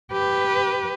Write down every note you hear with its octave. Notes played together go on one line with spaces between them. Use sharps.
G4 B4